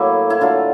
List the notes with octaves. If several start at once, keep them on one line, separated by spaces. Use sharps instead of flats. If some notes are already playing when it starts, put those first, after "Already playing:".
Already playing: A2 F#3 A#3 E4
E4
D3 F#3 A3 F4